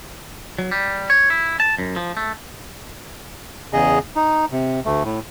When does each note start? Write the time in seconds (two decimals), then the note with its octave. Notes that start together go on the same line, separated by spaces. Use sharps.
0.59 F#3
0.72 G3
1.10 C#5
1.30 E4
1.60 A5
1.79 F#2
1.96 F3
2.17 A3
3.73 E2 C#3 G#4 D#5
4.16 D#4
4.52 C3
4.85 D2 A3
5.04 A2